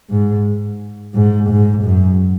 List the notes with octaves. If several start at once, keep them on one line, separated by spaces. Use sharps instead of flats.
G#2
G#2
G#2
F#2